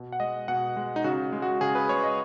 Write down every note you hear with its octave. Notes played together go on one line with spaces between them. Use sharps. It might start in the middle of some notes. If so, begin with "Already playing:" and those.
Already playing: B2
F#5
G#3 D#5
B2 F#5
G#3
D#4
C#3 F#4
G#3
F#4
C#3 G#4
B4
G#3 C#5
D#5